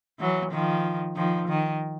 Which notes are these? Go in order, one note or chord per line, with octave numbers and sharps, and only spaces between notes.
E3 F#3
D#3 F3
D#3 F3
D#3